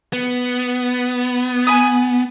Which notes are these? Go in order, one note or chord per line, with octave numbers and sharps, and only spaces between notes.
B3
G#5 B5 D#6